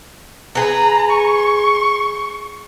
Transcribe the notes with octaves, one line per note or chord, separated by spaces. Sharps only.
G#4 B4 A#5
C#6